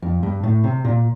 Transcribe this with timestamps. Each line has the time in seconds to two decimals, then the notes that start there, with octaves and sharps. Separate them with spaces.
0.02 F2
0.23 G2
0.43 A2
0.64 C3
0.84 A#2